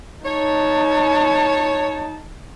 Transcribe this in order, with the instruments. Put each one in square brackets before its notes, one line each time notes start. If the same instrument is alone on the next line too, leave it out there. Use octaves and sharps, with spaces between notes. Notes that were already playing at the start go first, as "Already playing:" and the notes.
[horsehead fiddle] D#4 A5 [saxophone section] C#5